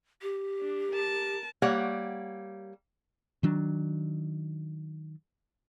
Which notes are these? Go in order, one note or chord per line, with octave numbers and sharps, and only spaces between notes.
G4
D4
A#4 A5
G3 A#3 C#5 F#5
D#3 F#3 D4